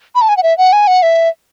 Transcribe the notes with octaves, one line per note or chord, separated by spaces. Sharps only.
B5
A5
G#5
F#5
E5
F#5
G#5
F#5
E5